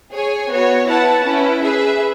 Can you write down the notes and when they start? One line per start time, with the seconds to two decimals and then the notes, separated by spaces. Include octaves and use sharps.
0.12 G#4 C#5 G#5
0.50 B3 F#4 C#5
0.88 E4 B4 F#5 A5
1.26 C#4 E4 B4
1.64 G#4 B4 E5